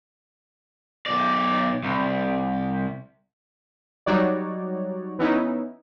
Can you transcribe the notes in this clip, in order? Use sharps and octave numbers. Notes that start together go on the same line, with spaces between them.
B1 D5
C2
F#3 G3 D#4 F#4 C#5 D5
E3 B3 C#4 D#4 E4